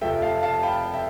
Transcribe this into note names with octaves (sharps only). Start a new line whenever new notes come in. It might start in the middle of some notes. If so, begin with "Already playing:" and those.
F1 F2 C3 F3 A3 E5 G5
F5 A5
F5 A5
G5 B5
E5 G5